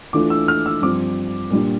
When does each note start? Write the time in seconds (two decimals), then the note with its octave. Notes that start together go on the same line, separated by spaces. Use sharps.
0.13 E3 A3 D4 F4 D6
0.30 E6
0.48 F6
0.66 E6
0.82 G2 F3 C4 D6
1.51 A#2 G3 D4